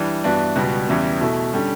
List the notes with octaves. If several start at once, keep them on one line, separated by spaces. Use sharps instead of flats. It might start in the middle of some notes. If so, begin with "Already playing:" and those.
Already playing: E3 G3 D4
G2 E3 B3 D4 F#4
C#2 B2 G3 B3 F#4
E2 C#3 E3 G3 B3
B2 A3 E4
D3 G3 C#4